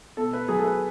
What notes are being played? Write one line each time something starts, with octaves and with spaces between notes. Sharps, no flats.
B2 A4
B4
F#3 G#4
A4
B4